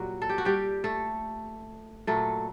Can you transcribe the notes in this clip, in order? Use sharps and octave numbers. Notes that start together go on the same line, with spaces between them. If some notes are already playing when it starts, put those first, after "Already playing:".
Already playing: A#2 F#3 G3 F#4
A4
G4
F#4
G3 G4
A3 A4
A#2 F#3 A3 A4